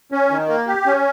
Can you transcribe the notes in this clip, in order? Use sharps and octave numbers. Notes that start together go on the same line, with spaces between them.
C#4
D#3
A#3
G4
C#4